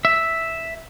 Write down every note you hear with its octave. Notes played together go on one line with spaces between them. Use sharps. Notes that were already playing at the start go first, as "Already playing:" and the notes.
E5